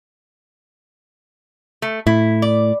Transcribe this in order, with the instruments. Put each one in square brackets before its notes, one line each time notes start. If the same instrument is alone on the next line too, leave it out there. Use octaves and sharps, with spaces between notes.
[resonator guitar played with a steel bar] A3
[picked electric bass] A2 [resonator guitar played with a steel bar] E4
[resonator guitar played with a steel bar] D5